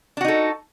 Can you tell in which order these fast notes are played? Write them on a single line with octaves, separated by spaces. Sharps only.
D4 F#4 D#4 A4